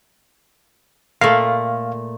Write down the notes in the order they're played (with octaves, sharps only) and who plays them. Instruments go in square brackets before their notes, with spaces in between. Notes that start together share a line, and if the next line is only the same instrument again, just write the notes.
[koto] A#2 A3 [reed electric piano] F5